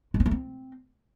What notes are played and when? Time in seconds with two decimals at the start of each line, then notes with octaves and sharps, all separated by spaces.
0.14 G#3
0.20 C4
0.26 A3
0.31 C4